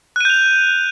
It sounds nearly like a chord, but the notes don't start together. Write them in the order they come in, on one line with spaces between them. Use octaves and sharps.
F#6 D#7 G6 F7